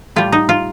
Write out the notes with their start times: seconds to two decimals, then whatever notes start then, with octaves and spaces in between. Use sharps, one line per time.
0.16 A2 G3 F4
0.32 D#4
0.49 F4